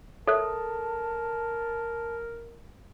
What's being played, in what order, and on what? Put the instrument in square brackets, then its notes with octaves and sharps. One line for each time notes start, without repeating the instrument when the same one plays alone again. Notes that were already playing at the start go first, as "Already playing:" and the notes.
[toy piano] A4 [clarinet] A#4 [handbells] C#5 E5 F#6 [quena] A5